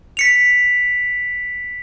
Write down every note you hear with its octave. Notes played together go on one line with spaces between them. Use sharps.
B6 C#7 F7